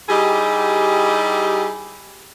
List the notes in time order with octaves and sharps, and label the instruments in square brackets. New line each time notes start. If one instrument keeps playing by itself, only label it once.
[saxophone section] G3 D#4 E4 G4 G#4